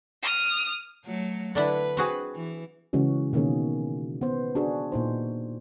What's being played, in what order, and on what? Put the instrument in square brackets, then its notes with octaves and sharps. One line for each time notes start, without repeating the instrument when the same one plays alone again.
[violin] D#6 F6
[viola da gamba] F#3 A3
[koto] D3 D4 E4 [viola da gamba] B4
[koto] C4 F#4 G#4
[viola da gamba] E3
[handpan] C#3 E3 G#3 C#4 F#4
B2 D#3 A#3 C#4 G#4
B3 C5
D4 F#4 G#4
A#2 D#4 C5